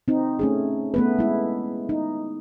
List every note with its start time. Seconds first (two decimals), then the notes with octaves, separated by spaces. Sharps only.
0.08 C4 D#4
0.39 A3 C#4 G#4
0.94 A3 B3 B4
1.19 G#3 E4
1.89 D#4